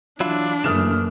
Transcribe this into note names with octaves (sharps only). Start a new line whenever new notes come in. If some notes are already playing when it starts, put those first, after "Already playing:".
E3 F#3 D4 E4 F4
F#2 C#3 E3 A3 A#3 D#6 F6 E7